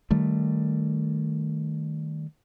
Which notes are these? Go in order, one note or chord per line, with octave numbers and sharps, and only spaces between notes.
D#3 G3 A3